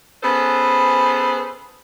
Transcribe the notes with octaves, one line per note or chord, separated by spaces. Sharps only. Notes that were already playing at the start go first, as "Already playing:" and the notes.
B3 C#4 G#4 A4 B4 C5